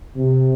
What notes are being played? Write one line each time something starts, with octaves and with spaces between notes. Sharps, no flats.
C3